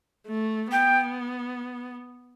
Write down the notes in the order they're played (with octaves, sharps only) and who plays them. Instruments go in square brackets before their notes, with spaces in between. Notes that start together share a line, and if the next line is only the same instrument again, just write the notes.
[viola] A3
[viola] B3 [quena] G5